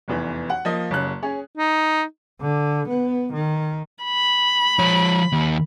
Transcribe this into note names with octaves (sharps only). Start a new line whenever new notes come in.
F1 E2 E3
F#5
F3 A#3 D#5
F#1 C#3 F#6
C#4 G#4 C#5
D#4
D3
B3
D#3
B5
F3 C#5
D#2